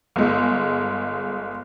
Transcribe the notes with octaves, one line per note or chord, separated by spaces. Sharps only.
G1 G#3